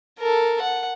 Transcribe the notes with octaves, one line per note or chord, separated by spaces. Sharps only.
A4 A#4
F#5